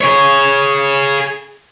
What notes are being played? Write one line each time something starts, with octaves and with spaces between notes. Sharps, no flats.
G#4 C#5